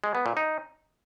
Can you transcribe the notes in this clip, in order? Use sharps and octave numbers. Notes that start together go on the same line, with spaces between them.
G#3
B3
A#2
D#4